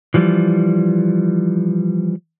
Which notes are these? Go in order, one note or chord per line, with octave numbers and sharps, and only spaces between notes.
E3 F3 G3